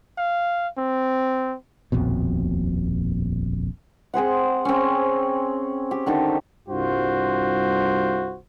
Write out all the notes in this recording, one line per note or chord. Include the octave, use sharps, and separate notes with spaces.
F5
C4
D#1 A#1 F2 B2
C4 G#4 C5 F#5
C4 C#4
G4
D3 D#3 D#4 A4
C2 G2 F4 F#4 C5